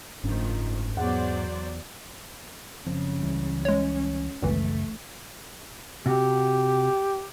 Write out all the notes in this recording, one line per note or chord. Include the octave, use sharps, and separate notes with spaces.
F#1 G#2 D#3 F3 A3 C#4 D4
E2 F#3 B3 G#4 C5 D5 F#5
F#1 C#3 F3 C4
C#2 E3 G3
G#3 C#4 C#5
G#1 C#2 F#2 C#3 E3 A3
C3 F#4 G4